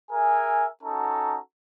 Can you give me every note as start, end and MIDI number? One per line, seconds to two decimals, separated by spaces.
0.12 0.68 68
0.12 0.68 70
0.12 0.68 76
0.12 0.68 80
0.84 1.39 61
0.84 1.39 63
0.84 1.39 66
0.84 1.39 69
0.84 1.39 82